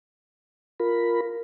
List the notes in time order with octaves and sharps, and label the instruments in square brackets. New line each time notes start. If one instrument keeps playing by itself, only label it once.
[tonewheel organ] F4 A#4 B5